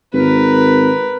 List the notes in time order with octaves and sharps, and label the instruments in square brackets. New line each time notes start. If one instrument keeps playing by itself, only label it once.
[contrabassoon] G#1 [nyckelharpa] A#4 B4